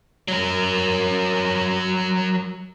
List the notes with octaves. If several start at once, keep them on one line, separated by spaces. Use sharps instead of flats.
F#3 A#4